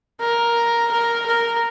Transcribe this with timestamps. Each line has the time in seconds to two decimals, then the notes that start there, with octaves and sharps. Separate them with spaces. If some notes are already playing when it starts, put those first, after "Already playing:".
0.21 A#4
0.91 A#4
1.26 A#4